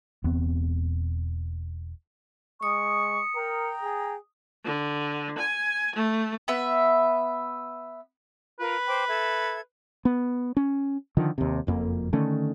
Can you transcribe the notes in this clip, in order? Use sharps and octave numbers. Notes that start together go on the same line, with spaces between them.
E1 E2 B3 C4
G#3 C#6 D#6 C#7
A#4 G5 A#5
G#4
D3
G#5
A3
B3 B4 E5
F4 A#4 B4
C5 G5 D6
A4 E5 G#6
B3
C#4
D3 D#3 F3
D#2 C3
F#1 F2 A#3
D3 D#3 A3 C#4